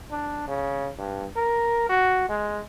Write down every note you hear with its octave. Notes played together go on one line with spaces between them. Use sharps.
D4
C#3
G2
A#4
F#4
G#3